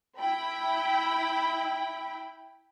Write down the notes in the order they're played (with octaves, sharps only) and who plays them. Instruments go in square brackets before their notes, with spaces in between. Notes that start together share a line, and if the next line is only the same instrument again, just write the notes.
[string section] E4 G5 B5